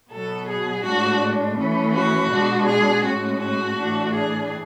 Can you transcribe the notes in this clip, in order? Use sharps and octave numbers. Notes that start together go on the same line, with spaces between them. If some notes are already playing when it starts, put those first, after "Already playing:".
B2 F#3 B3 A4
G#4
A2 G#3 D4 F#4
E3 A3 C#4
F#4
B2 G#3 D4
G#4
A2 G#3 C#4 F#4
F#4
A2 E3 A3 D4
G#4